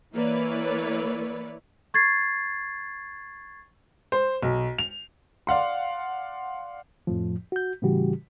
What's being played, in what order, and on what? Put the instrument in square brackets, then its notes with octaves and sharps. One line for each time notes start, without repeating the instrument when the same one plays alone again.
[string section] E3 A#3 E4 B4 C#5 D5
[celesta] C#6 G#6 A6 C7
[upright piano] C5
B1
F7
D5 F5 F#5 C6
[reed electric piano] F2 A2 F3
F#4 G6
A2 C#3 E3 G3 F#4 G4